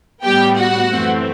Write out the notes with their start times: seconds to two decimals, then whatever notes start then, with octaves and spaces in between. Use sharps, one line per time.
0.23 A2 G3 B3 G4 G5
0.56 F#4 F#5
0.91 F#2 E3 A3 C4